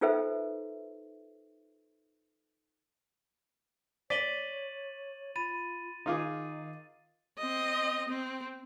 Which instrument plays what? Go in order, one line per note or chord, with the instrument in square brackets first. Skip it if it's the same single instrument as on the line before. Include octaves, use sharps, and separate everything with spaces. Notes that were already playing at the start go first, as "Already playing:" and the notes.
[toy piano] D#4 F4 A4 B4 C5 E5
[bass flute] C#5 [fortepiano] D5 [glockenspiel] A6 D#7 F#7 [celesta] B6 G7
[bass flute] F4 [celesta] B5 [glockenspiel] A6 D#7
[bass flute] D#3 [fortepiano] D#4 F4 G#4 [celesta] F5 D6
[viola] C4 D#5
C4